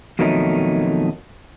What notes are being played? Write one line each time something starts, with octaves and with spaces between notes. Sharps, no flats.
F2 B2 D#3 F#3 A3 D#4